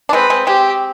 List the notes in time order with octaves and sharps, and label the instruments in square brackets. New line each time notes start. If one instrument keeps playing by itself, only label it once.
[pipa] D4
[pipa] G#3 C4 [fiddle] B4
[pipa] G#3 C4
[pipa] G#3 C4 [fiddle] G4